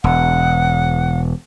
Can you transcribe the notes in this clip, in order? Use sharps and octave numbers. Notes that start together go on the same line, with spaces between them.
E1 F#5